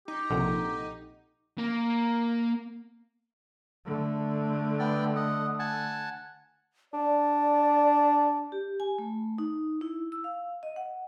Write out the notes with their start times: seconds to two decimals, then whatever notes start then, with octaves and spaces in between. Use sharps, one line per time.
0.08 D#4 G4
0.30 A#1 C3 A4 F#5
1.58 A#3
3.85 D3 A3
4.79 B3 D5 G5
5.16 D#5 F#5
5.59 F#5 G#5 A5
6.93 D4 D5
8.52 G4
8.80 G#5
8.98 A3
9.38 D#4
9.81 E4
10.12 E6
10.24 F5
10.63 D#5
10.76 F#5